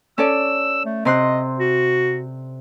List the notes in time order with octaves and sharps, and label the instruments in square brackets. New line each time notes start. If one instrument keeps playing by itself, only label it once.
[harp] C#4 A4 D5 [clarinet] E6
[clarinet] A3
[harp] C3 C6 F#6 [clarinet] D#5
[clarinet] F#4